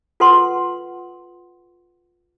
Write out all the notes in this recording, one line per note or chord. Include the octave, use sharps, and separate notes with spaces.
F4 A4 B4 F#5 G#5 C6